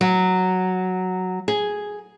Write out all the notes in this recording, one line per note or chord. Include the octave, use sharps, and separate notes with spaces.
F#3
G#4